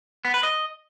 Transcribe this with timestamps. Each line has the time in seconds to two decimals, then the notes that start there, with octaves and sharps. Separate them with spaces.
0.25 B3
0.34 B4
0.43 D#5